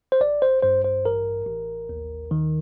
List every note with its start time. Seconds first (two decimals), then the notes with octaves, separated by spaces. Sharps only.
0.12 C5
0.21 A1 D5
0.42 C5
0.62 G2 C5
0.84 C5
1.05 A1 A#4
1.46 A1
1.89 D#2
2.31 D#3